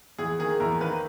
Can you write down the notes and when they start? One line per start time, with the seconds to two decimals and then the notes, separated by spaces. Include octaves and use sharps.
0.18 E2 G#4
0.39 D#3 A#3 G#4
0.60 E2 A#4
0.80 D#3 A#3 B4